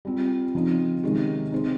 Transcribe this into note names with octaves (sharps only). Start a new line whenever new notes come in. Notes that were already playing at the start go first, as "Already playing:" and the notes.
G3 C4 F4
C#3 F3 C4 D#4
C3 D#3 G#3 C#4 G4
C4 D#4 G#4 C5